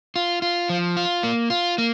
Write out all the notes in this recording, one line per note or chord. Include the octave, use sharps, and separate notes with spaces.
F4
F4
F3
F4
A#3
F4
A#3